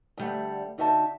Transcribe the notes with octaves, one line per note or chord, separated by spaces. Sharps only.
D2 B2 G3 A3 F#5
D3 D#4 F#4 E5 F5 A5